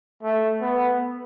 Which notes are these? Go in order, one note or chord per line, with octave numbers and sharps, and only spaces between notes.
A3
B3